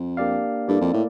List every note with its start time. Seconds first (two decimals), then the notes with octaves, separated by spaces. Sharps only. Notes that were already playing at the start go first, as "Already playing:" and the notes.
Already playing: F2
0.17 A#3 D4 G4 D5 F5
0.68 G2 A#3 E4 A4 D5
0.81 F2
0.93 A2